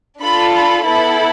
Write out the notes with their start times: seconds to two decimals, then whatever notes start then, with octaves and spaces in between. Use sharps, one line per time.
0.22 D4 F4 A4 B5
0.54 B5
0.85 B3 E4 A4 B5